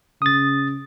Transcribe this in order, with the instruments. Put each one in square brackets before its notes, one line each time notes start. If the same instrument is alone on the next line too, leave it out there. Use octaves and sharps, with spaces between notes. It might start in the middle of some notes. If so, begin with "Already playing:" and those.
[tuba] C#3 [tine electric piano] D#6 A6